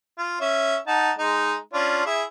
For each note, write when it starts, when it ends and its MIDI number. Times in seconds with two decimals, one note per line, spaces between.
0.18 0.39 65
0.41 0.76 61
0.41 0.76 76
0.87 1.11 63
0.87 1.11 78
0.87 1.11 81
1.19 1.56 56
1.19 1.56 63
1.73 2.02 61
1.73 2.02 62
1.73 2.02 65
2.06 2.23 64
2.06 2.23 68
2.06 2.23 76